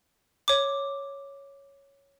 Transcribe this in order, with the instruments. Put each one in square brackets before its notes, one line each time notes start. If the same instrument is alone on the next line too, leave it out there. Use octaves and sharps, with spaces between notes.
[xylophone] C#5 D6